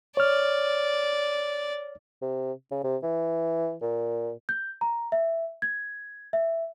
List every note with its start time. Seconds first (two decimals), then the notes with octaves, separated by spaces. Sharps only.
0.17 C#5 D5 F6
2.22 C3
2.71 C#3
2.84 C3
3.03 E3
3.82 A#2
4.49 G6
4.81 A#5
5.12 E5
5.62 G#6
6.33 E5